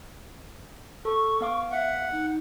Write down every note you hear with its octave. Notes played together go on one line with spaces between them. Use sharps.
A4 C#6
B3 F5 D6
E5 F#5
D#4